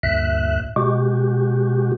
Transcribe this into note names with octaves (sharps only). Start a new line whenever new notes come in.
D2 G2 A#2 E5 F#6
B2 G#3 F#4 G4